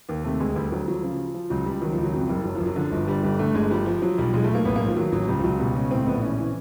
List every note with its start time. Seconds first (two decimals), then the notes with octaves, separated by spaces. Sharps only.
0.09 D#2
0.24 C3 A3
0.40 D2 G#3
0.56 D2 G3
0.72 D2 F#3
0.87 F3 F#3
1.03 C#3 F3
1.19 F3
1.34 F3
1.50 C#2 F#3
1.66 C#2 G3
1.82 D#3 F#3
1.92 F3
1.98 C#2
2.03 F#3
2.13 F2 F#3
2.29 F#1 G3
2.44 F#1 F#3
2.55 F3
2.60 F#1
2.66 F#3
2.76 D3 F3
2.92 G1
3.07 D3 G3
3.23 G1 G3
3.39 D3 A3
3.55 G1 G#3
3.70 F3 G3
3.86 F3
4.02 F3 F#3
4.18 B1 G3
4.34 B1 G#3
4.44 A3
4.49 B1
4.55 A#3
4.65 A1 B3
4.76 A#3
4.81 G#2
4.86 F3
4.96 D#3 F#3
5.12 A1 F#3
5.28 C#2 G3
5.39 F3
5.44 C#2 F#3
5.60 B2 G3
5.75 C#2 C#4
5.91 A2 C4
6.06 A#1 B3
6.22 E3 C#4
6.39 E3